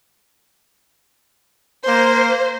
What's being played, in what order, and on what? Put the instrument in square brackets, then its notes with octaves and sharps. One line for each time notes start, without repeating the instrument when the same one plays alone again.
[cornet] A#3 [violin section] C5